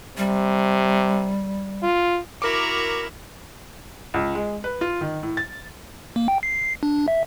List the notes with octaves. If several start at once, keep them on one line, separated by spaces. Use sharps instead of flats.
C3 G3
F4
E4 F#4 A#4 A#5 D6
C#2
G#3
B4
F4
D#3
A2
A6
A#3
G5
C7
D4
E5